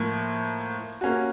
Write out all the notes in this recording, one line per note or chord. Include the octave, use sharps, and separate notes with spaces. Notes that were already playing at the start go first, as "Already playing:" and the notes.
Already playing: A2 F3 A#3
A#3 C#4 F#4